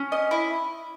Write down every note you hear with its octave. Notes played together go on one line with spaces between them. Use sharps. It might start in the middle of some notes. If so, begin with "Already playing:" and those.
Already playing: C#4
D#5
E4